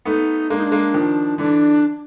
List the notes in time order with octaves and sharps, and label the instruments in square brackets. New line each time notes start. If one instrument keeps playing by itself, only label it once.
[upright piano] A3 B3 [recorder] D#4
[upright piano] G#3 A#3 [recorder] D4
[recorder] D#4
D4
[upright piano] G#3 A#3
D#3 F3
[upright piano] D3 E3 [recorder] D4